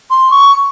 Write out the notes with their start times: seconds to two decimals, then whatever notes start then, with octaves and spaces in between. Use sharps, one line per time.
0.10 C6
0.31 C#6